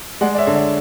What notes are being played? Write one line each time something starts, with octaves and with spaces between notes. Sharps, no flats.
G#3 D5 F#5
D5
C#5 E5
D3
D5